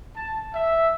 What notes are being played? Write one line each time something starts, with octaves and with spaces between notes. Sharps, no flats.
A5
E5